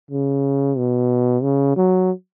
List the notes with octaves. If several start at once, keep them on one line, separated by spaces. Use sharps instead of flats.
C#3
B2
C#3
F#3